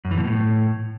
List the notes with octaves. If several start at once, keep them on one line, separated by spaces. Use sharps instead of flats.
F#2
E3
B2
A2